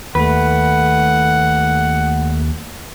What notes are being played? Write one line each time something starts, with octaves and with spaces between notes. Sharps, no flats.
D#2 A3 B4 F#5